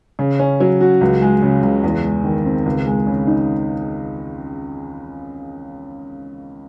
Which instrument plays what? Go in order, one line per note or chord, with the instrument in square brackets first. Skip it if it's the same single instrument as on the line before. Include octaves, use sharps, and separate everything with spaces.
[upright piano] C#3
C#4
F#3
F#4
C#2
G#3
C#3
C#2
E2
G#3
D#3
C4
C#2
G#3
C#3
D#4